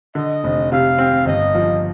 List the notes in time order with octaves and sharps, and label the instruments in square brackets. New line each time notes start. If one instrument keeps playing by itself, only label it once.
[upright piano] D3 [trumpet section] D#5
[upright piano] F1
[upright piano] C3 [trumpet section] F5
[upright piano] C4
[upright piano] G1 [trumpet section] D#5
[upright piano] F3